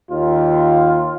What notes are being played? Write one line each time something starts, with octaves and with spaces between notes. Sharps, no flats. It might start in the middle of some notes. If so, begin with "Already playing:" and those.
D#2 F4